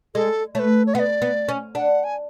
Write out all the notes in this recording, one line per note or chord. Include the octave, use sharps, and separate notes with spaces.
G#3 A4
A3 B4 C#5
C#5
B3 F#5
D5
B3
C#4
D4 F#5
G#5